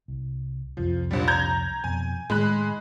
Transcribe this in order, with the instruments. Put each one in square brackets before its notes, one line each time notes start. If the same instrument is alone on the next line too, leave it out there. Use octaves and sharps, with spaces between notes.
[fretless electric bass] C2
[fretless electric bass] C2 F2 [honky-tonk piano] F3
[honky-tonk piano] A#1 G3
A#5 G6 G#6
[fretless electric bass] F2 B2 [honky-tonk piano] G#5
[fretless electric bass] A2 D#3 [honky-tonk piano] G#3 B5 F#6